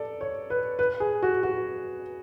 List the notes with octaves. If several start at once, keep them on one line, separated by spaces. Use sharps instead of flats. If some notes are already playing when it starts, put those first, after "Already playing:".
Already playing: A4 D5
C#5
B4
B4
G#4
F#4
F#4